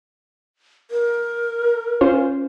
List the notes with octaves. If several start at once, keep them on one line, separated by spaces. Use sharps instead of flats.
A#4
C#4 F4 C5